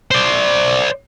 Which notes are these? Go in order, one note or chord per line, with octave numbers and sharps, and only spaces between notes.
C5 D5